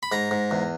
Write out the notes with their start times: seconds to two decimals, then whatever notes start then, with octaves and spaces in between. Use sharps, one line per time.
0.03 B5
0.12 G#2 A#5
0.31 G#2
0.51 E2